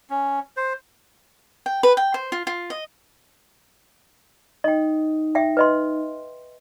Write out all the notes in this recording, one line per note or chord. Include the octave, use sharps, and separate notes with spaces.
C#4
C5
G5
B4
G5
C5
F4
F4
D#5
D#4 D#5 G5
E5 G5
B4 D#5 C6